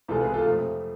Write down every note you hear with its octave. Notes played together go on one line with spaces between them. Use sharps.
E2 C3 G#3 F4 A4
G#4 B4
F4 A4
F2 C3 F3 A3